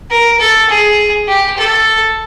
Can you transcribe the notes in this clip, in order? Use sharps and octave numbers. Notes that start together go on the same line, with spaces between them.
A#4
A4
G#4
G4
A4